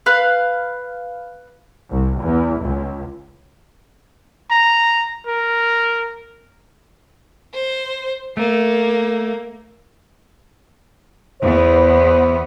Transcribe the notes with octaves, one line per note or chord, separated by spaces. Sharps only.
B4 F5 F#6
C2
E2
C#2
A#5
A#4
C5
A3 A#3
E2 B3 C5